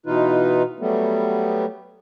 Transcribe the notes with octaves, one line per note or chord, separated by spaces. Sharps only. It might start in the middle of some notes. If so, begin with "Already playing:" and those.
B2 E3 D#4 F4 B4
F#3 G3 A3 B3